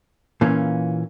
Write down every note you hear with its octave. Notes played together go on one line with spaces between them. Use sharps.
A#2 E3 A#3 C#4